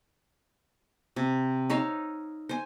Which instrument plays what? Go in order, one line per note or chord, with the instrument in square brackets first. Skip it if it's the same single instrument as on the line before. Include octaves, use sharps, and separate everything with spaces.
[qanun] C3
D#4 C#5 E5 F5
C5 G#5